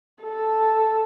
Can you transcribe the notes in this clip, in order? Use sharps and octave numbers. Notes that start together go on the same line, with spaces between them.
A4